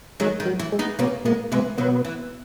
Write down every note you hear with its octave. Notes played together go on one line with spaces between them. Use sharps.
D#3 F#3 G#3
D#3
F#3
E3
G#3
B3 D#4
B2 A#3 B3 C#4
A#2 G#3 A#3 B3
B2 E3 G#3 B3
B2 D#3 F#3 B3
E3